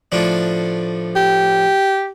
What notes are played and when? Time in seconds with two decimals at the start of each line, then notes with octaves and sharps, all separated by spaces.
0.12 A2 F3 D4
1.16 G4